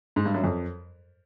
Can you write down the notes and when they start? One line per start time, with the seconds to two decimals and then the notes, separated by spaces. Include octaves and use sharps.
0.16 G#2
0.26 G2
0.34 F#2
0.44 F2